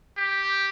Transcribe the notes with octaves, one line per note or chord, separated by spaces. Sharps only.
G4